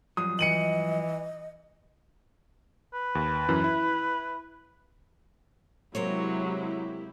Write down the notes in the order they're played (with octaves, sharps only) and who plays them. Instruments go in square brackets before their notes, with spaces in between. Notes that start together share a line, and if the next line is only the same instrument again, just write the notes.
[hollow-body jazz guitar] G2 F3 F#3 [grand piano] D#6
[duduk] E3 [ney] D#5 [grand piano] C#7 D#7 F#7
[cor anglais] B4
[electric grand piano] D#2
F#2 E3
E4
[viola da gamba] C3 G#3 [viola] F#3 [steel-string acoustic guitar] A#3 C5 C#5 [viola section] E4 G4